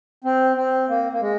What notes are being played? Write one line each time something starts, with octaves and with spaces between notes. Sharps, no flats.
C4
C4
A#3
A#3
G#3